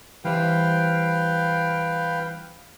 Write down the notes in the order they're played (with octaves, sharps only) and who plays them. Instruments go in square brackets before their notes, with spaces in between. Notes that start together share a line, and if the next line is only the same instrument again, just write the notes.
[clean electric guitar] E3 G3 C5 [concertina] B4 F5 G5